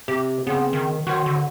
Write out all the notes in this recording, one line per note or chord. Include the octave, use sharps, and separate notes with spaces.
C3 G4
C#3 B3 C4
D#3
D#3 F#4 C5 C#5
D3